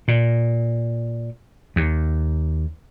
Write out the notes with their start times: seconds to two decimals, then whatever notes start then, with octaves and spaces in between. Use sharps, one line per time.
0.08 A#2
1.76 D#2